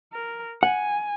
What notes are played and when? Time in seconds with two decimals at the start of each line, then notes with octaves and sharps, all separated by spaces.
0.13 A#4
0.63 F#5 G#5